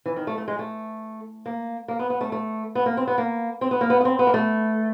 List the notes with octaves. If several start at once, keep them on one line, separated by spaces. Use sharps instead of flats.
E3
D#3
A3
A3
G#3
A3
A#3
A#3
B3
B3
A3
A3
B3
A#3
C4
B3
A#3
C4
B3
A#3
B3
B3
C4
B3
A#3
A3